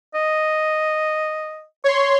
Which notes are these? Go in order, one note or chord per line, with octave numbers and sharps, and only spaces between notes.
D#5
C#5 C6 C#6